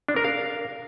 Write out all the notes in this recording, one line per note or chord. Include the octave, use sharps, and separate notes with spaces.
D4
A#4
F5